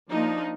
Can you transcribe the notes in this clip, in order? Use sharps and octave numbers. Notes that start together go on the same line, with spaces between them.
F3 A#3 D4 D#4